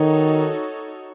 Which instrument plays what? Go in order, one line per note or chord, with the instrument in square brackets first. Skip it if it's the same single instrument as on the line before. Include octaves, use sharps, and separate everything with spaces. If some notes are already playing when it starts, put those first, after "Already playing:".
Already playing: [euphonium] D#3 [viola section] D#4 F#4 A4 C#5